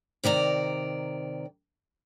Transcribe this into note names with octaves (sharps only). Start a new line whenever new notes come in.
C3 D#3 D5 A#5